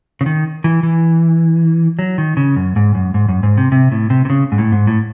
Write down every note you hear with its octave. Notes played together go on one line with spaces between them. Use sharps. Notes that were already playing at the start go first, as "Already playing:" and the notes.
C#3
D#3
E3
E3
F#3
D#3
C#3
F#2
G#2
F#2
G#2
F#2
G#2
C3
C3
A2
C3
C3
C#3
G#2
A2
G#2
A2